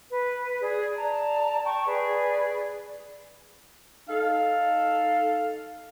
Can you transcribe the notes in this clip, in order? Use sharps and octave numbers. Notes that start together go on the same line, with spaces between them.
B4
G#4 D5
D5 A5 A#5
G5 A5 C#6
G#4 B4 D5
D#4 A4 F5